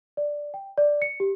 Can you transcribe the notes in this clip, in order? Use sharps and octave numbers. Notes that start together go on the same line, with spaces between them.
D5
G5
D5
C#7
G4